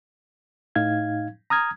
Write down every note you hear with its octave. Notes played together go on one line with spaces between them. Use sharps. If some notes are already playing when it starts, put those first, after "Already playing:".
A2 D#4 F5 G#6
A#5 D#6 F6 G#6